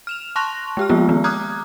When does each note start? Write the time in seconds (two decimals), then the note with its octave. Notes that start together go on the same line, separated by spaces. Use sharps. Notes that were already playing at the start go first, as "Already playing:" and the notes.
0.07 F6 E7 F7
0.36 A5 C6 C#6 F#6 A#6 F7
0.77 G#3 G4 F6
0.89 F3 G#3 A#3 B3 F4 G4
1.09 D#3 B3
1.24 A#5 D6 D#6 F6 F#6 G#6